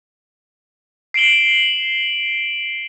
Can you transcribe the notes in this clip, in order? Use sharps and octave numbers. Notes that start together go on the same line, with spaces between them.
C7 D7 E7 F#7 G7